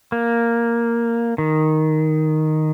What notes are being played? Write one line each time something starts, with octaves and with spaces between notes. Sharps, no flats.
A#3
D#3